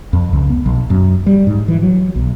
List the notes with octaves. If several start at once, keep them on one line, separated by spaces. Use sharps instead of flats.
F2
C#2
B3
B1
F#2
G3
G#2
E3
F#3
B1